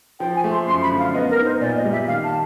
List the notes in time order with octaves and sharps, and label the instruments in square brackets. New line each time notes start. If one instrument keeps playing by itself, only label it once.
[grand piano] F3 [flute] G5
[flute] G#5
[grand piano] A3
[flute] C6
[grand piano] F#2 [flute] C6
[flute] B5
[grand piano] D3
[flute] F5
[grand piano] B3 [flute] D#5
[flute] A#4
[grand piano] D#4
[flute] C5
[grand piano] A#2 [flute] D5
[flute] D#5
[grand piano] G3
[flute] E5
[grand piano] D#3 [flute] F5
[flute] A5